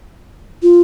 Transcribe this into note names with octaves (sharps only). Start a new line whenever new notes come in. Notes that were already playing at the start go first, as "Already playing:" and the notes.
F4